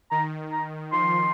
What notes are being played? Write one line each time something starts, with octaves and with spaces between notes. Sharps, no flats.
D#3 A#5
A#5
F3 C6